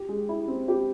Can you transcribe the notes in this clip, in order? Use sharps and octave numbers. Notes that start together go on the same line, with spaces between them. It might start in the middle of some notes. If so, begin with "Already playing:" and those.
Already playing: G4
G#3
E4
C4
G4